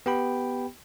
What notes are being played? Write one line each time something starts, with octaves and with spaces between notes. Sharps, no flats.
B3 G4 G5 B5